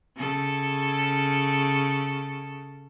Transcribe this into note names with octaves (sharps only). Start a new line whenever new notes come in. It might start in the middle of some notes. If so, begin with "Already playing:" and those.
C#3 A4